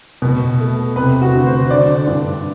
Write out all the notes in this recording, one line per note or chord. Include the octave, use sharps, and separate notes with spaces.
B2
A3
C3 B4
F#4
D2
C5
D3 D5
G2